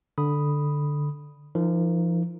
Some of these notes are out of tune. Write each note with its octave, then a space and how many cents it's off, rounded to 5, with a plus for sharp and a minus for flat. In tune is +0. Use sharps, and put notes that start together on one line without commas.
D3 +0 B5 +0 D#6 +0
F3 -30 D#4 +0 A#4 -15